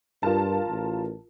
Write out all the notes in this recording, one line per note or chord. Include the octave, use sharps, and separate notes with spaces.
G2 F4 A#4 A5
A1